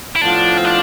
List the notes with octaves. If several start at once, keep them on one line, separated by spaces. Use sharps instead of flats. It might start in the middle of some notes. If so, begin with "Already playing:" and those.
E4
A2 F3 B3 D4 F4
C4
D4